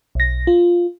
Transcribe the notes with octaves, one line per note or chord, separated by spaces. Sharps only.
B1 A#6
F4